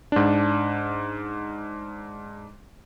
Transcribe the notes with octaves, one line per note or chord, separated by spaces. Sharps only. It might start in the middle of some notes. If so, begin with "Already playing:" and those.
G#2 D4